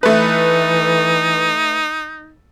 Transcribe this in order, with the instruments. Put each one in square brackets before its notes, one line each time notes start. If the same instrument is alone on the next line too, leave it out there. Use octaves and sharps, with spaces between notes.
[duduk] E3 [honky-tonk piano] A3 B4 [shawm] D#4